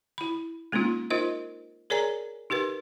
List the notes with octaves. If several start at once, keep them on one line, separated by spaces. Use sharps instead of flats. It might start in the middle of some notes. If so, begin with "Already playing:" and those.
E4 B5
G#3 A#3 C4 C#4 D#4 F4
D#4 F4 A#4 C5 D#5
G#4 A#4 C#5 D5 G#5 A#5
D#4 G4 A#4 B4